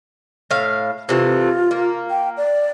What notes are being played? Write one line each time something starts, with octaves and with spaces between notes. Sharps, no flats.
A2 F5
C3 E3 A3 F4
A#3
G5
D5